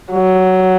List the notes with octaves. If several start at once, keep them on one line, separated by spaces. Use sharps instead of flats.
F#3